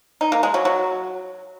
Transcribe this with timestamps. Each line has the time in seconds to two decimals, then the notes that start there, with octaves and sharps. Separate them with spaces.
0.21 D#4
0.32 A#3
0.43 G#3
0.54 F#3
0.65 F#3